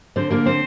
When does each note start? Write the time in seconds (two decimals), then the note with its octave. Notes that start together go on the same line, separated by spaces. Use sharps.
0.16 D3 C4 C5
0.31 D3 A#3 A#4
0.46 C4 C5